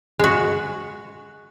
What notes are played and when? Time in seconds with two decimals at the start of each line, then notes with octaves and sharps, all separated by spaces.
0.19 G#3 F#4